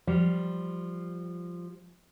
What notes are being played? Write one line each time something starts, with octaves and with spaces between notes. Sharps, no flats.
F3 G3